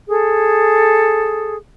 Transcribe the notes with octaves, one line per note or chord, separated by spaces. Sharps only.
G#4 A4